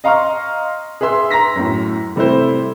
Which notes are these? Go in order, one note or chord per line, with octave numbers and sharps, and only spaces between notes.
D#5 F5 A#5 C6 C#6 F6
G#4 B4 E5 C6 E6
A#5 C6 A#6 B6
F#2 A2
C3 G3 A3 E4 C5